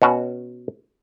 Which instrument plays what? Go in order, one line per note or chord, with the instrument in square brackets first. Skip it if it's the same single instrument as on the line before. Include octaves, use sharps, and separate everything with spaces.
[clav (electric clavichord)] B2 C#4 F#4